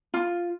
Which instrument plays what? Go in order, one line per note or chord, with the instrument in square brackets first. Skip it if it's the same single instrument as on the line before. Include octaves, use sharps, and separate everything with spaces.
[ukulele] F4